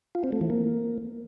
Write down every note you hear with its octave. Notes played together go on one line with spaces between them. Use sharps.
F4
C4
A3
E3
A#3